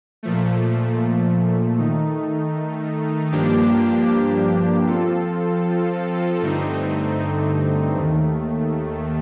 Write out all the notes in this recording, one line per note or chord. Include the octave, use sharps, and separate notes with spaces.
A#2 F3 A3
D#3 A3 D#4
G2 F3 A#3 D4 G4
F3 C4 F4 A4
G2 D3 A3 C4 D#4
D#2 D#3 A3